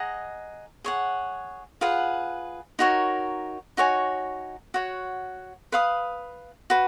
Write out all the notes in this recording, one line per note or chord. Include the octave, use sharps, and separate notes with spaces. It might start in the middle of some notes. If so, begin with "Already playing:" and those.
Already playing: G#4 D#5 F#5 A#5
G#4 C#5 F#5
F4 G#4 B4 F#5
D#4 F#4 A#4 C#5
D#4 F#4 C#5 G#5
F#4 C#5 F#5
B4 F5 B5 D#6
F#4 B4